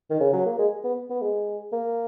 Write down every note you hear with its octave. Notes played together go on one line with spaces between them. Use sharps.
D#3
C#3
F#3
A#3
G#3
B3
B3
G#3
A#3